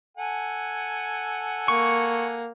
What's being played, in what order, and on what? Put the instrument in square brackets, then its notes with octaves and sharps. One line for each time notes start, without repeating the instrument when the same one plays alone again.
[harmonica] A4 F#5 G#5
[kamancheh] A#3 [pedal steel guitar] C#6